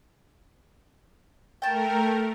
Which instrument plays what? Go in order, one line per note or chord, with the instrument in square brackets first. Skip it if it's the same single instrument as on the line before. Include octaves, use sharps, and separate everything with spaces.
[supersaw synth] A3 A#4 [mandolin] G5 A5